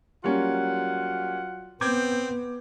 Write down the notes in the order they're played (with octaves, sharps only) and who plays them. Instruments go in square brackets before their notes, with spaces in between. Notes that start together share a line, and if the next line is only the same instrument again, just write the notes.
[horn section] F#3 F4 F#5 [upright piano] G3 A#3 C#4
[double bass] B3 [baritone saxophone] C4 [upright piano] D6 G6 G#6